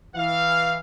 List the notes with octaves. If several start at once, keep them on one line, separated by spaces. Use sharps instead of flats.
E3 F5